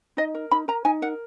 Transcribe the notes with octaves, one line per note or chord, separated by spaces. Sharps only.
D#4 D#5
A#4
D#4 B5
A#4 A#5
D#4 G#5
A#4 F#5